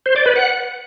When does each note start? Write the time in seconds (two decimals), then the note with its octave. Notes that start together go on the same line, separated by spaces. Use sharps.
0.06 C5
0.16 D5
0.26 B4
0.36 F#5